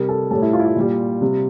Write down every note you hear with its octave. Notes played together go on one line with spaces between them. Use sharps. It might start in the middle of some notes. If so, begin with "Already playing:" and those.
Already playing: C3 G3 A#4
A4
A2 G3 A4
E4
F4
E4
F4
A#2 G3
C3 G3